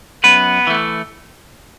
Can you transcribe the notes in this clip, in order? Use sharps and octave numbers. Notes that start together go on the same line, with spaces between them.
F#2 B3 B4
E3 A3